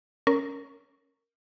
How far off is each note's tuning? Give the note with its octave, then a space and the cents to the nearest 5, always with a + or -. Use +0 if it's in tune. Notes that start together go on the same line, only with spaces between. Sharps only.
C#4 +5 A#4 +0